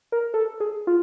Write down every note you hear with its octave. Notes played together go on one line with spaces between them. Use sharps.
A#4
A4
G#4
F4